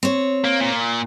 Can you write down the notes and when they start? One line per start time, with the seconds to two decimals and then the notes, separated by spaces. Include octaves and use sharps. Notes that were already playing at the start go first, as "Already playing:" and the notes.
0.03 C4 C#5
0.45 A#3
0.60 A#2